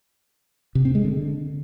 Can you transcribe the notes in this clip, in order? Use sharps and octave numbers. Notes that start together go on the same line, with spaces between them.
C3
C4
G#3
D3